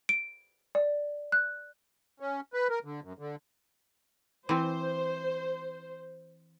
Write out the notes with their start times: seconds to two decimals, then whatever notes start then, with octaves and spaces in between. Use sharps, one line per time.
0.09 D7
0.75 D5
1.32 F#6
2.20 C#4
2.53 B4
2.70 A#4
2.84 D3
3.03 F#2
3.19 D3
4.49 E3 C4 C5